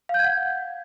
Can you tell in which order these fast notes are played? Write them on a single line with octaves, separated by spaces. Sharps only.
F5 G6 G#6 F#5